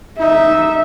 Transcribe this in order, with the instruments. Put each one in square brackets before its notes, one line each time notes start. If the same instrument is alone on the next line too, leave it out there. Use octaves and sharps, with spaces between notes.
[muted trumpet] D#4 [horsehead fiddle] E5